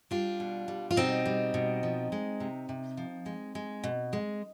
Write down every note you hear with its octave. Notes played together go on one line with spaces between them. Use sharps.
G3 D4 F4
B2
G3
F4
B2 C4 D#4
G3
B2
F3
G#3
C3
C3
F3
G#3
G#3
B2
G#3